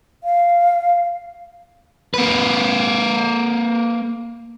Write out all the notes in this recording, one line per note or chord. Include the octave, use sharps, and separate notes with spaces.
F5
A#3 B4